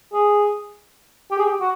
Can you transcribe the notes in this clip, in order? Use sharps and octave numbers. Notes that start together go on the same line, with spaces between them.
G#4
G4
G#4
G4
F#4